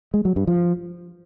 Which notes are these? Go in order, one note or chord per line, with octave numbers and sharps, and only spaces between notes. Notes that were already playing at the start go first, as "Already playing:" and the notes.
G#3
F#3
G2
F3